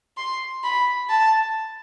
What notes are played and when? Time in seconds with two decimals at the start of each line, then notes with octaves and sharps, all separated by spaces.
0.17 C6
0.64 B5
1.09 A5